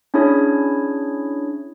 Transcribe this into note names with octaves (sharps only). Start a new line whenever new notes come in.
C#4 D4 E4 G#4 C#5